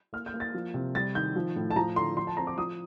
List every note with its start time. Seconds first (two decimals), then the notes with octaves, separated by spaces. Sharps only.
0.13 A#3 F6
0.26 G6
0.34 A#3
0.40 A6
0.54 F3
0.74 C3
0.95 G3 A6
1.15 D#3 G6
1.36 F3
1.56 A2
1.71 A5
1.76 F3 A#5
1.96 D3 C6
2.17 F3 C6
2.27 A5
2.37 C4 A#5
2.47 D6
2.58 F3 D#6